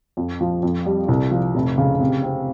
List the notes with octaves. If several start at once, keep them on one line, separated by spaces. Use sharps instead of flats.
F2
F3
F2
G3
C2
F3
F1
C#3
C3
C4